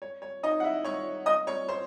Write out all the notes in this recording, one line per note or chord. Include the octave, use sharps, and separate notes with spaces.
C#5
C#5
D#4 D#5
F#5
E4 E5
C#5 C#6
D#5 D#6
C#5 C#6
C5 C6